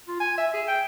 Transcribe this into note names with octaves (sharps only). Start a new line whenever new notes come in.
F4
G#5
E5
G#4
G5